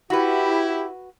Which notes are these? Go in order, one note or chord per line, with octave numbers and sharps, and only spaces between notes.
E4 F#4 G4 B4